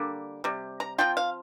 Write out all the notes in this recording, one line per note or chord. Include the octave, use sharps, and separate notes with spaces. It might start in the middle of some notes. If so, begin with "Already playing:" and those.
Already playing: D3 G3 A#3
C3 G3
A#5
F3 C4 F4 G5
F5